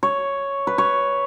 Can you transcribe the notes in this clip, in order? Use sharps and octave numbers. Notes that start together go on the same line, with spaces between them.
C#5
B4
C#5